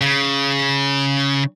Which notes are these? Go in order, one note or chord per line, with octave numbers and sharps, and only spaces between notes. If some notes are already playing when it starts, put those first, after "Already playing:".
C#3